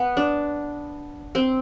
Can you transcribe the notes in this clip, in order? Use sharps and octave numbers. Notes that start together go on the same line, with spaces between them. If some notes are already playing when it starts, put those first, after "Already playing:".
Already playing: B3
D4
C4